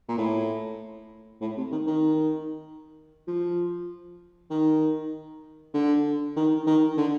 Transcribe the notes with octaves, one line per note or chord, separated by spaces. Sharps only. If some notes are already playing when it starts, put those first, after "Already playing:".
A#2
A2
A2
C3
D#3
D#3
F3
D#3
D3
D#3
D#3
D3